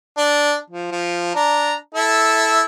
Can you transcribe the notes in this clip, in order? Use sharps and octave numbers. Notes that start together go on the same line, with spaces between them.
D4
F3
F3
D4 A#5
E4 A4